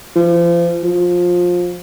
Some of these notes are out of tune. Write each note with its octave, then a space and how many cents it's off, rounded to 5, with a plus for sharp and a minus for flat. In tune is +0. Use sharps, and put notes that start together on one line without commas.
F3 -35
F3 +20